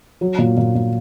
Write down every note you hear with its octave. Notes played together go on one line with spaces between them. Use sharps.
F#3
A#2
A#2
A#2